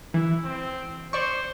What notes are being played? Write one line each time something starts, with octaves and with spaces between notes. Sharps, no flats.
E3 E4
C4
C5 D5 C#6